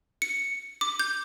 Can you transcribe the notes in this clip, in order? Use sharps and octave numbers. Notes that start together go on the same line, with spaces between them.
C#7
D6
G6